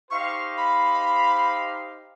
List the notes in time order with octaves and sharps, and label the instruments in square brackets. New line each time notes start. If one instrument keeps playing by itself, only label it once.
[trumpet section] D#4 G4 C5 F5 [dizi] C#6
[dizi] B5